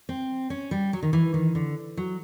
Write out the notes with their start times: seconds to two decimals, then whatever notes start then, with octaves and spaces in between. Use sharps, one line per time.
0.09 C4
0.50 C#4
0.71 G3
0.93 F#3
1.03 D#3
1.13 E3
1.34 D#3
1.55 D3
1.97 F#3